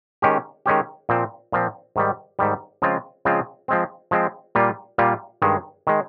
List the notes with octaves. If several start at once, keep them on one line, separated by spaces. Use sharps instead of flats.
D#3 G#3 C#4 G4
D#3 G#3 C#4 G4
A#2 F3 C4
A#2 F3 C4
G#2 D#3 G3
G#2 D#3 G3
C#3 F3 G#3 C4 F4
C#3 F3 G#3 C4 F4
F3 G#3 C4
F3 G#3 C4
A#2 G3 A#3 F4
A#2 G3 A#3 F4
G2 D#3 G#3
D#3 G#3